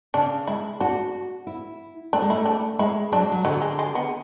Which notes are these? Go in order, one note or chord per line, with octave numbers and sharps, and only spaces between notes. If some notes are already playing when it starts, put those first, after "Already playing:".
C#3 D4
G#3 E4
D4 F#4
E4
A3 D4
G#3
A3 E4
D4
G#3 E4
F#3 D4
G#3
F#3
D3 F#3
G#3
G#3
B3